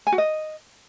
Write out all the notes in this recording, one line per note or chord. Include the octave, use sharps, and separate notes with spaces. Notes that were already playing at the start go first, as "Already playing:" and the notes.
G#5
F#4
D#5